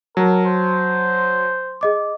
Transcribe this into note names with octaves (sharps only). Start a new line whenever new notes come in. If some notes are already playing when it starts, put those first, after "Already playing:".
F#3 A#4 A5
C5
G#4 D#5 D6